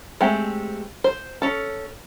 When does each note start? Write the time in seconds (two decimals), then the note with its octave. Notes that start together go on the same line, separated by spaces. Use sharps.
0.21 G#3 A3 C4 G4
1.04 C5
1.42 C#4 A4